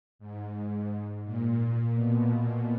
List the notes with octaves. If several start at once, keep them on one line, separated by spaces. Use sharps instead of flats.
G#2
A#2
B2